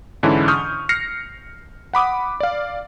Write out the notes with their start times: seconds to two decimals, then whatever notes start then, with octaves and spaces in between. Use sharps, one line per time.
0.23 G#2 D3 E3 C#4 D4 E4
0.48 C#6 D#6 F6 G6
0.89 F6 A#6 C7 C#7
1.93 F#5 B5 D6 D#6
2.40 D5 F5